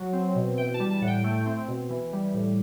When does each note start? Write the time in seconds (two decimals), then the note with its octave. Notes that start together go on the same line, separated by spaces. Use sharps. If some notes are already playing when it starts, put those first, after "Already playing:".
Already playing: F#3
0.13 C4
0.35 B2
0.57 E3 G5
0.74 A5
0.80 G3
0.90 A5
1.01 A2 F#5
1.07 G5
1.24 A3
1.46 C4
1.68 B2
1.90 E3
2.13 G3
2.34 A2